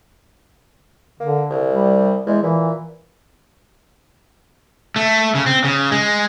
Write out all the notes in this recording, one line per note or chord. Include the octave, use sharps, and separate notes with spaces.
D3 A#3
C2
G3
E2 G#3
A#2 E3
A3
C#3
C4
C#3
G#3